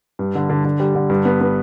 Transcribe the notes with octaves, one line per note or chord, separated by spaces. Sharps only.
G2
D3
D3
D3
G3
D3
G2
B3
B3